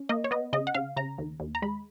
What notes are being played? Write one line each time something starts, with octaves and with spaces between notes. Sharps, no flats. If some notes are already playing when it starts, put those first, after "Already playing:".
Already playing: C#4
A#3 D#5
C#5
B3 D#5
C#3 D#5
F#5
C#3 F5
C#3 A#5
D#2
D#2
A#5
G#3 B5